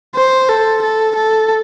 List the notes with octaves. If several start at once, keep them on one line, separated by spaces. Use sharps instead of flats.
C5
A4
A4
A4